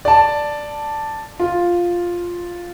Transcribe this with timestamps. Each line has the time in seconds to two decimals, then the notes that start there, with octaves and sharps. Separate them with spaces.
0.05 D5 A5
1.39 F4